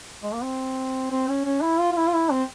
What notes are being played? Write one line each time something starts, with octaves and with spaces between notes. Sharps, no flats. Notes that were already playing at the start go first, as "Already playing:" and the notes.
G#3
A#3
C4
C4
C#4
C#4
E4
F4
F4
E4
F4
E4
C4